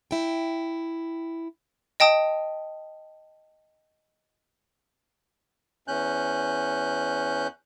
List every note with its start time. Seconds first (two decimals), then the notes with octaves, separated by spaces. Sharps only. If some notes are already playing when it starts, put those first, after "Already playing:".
0.11 E4 G5
2.00 D#5 G5 A5 D#6
5.88 E2 C#4 F#6 G6